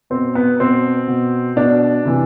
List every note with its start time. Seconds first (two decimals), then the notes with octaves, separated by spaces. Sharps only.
0.10 B2 C4
0.35 B3
0.60 B2 C4
1.07 B2
1.56 B2 D4
2.05 C3 E3